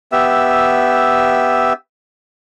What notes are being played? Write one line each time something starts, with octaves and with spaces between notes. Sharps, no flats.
B3 G4 E5 E6